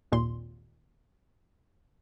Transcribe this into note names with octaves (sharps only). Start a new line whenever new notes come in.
G#1 D#2 A#2 C6